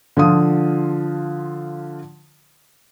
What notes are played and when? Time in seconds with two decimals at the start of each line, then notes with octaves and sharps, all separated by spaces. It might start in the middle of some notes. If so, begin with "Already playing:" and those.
0.17 D3 F3 F4 D#6